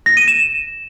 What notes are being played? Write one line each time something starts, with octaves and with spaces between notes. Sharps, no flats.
A#6
D#7
E7